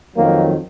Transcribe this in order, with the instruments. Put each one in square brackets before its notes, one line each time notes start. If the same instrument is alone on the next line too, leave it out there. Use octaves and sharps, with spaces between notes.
[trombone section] F2 D#3 F#3 A#3